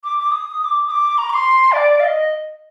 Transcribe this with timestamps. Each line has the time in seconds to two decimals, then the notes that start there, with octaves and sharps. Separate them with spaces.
0.03 D6
0.19 D6
0.31 D#6
0.60 D#6
0.64 D6
0.87 D#6
0.91 D6
1.18 A#5
1.30 D6
1.33 C6
1.72 D5
1.99 F5
2.04 D#5